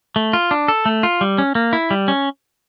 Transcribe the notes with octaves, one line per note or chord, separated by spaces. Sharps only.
A3
F4
D4
A4
A3
F4
G3
C#4
A#3
E4
G3
C#4